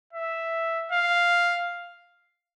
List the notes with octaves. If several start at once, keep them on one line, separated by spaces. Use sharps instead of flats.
E5
F5